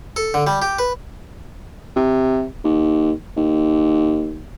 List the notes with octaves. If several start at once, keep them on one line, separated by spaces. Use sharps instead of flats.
A4
D3
G3
G4
B4
C3
D#2
D#2